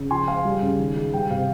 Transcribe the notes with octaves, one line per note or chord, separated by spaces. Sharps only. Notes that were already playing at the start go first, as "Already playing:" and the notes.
Already playing: C#3
F3 G#5 C6
G#3 F5 G#5
G3
C#3
D#3
G#3
G3 G5
C3 F5